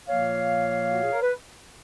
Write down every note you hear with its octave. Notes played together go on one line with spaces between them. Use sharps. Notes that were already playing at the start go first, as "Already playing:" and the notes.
A#2 F3 A#3 C#5 F5
F#4
G#4
A#4
B4